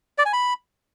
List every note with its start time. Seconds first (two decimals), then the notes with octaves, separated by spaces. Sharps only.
0.18 D5
0.26 G#5
0.33 B5